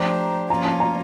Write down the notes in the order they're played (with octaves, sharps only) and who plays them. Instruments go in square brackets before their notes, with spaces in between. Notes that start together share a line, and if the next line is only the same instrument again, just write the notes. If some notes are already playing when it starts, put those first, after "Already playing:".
Already playing: [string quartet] F3 A3 D4 G4 C5 [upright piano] A#5
[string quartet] F3 A#3 C#4 F4 [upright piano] A#5
[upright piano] A5
A#5